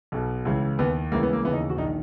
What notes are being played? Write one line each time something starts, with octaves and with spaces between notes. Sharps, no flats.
B1 B2
C#2 C#3 E3
D#2 D#3 B3
C#2 C#3 E3 A#3
B3
A#3
D#2 C#3 E3 B3
D#4
F#4
A#1 D#3 D#4